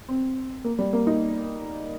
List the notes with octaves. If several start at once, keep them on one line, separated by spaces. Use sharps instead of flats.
C4
A#3
G3
A#3
D#4